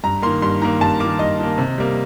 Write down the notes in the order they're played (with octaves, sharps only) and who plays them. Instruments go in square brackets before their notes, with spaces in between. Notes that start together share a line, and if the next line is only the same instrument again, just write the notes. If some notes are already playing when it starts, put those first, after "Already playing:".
[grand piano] G2 A#5
D#3 A#3 C6
G2 C6
D#3 A#3 A#5
G2 A5
D#3 A#3 D6
G2 D#5
D#3 A#3
C3
G3 A#3